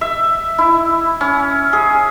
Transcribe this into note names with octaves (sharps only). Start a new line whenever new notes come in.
E5
E4
C#4
G#4